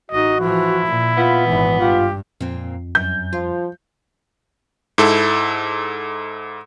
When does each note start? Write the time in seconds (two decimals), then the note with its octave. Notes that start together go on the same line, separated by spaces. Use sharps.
0.11 A1 D#4 F#4 D#5
0.40 E3 F3 E4
0.85 A#2
1.17 B3 F4
1.46 G#1 G#2 E3
1.80 G2 F4 G4
2.41 F2 A#2 C4
2.95 F#2 G6
3.33 F3 F4
4.98 G#2 E4 A4